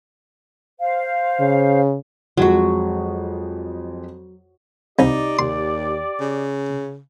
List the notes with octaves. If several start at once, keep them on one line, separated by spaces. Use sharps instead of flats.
C5 F5
C#3
F2 F#3 G#3 F#4
C2 D#4 G4 D5
D#2 C6
C#3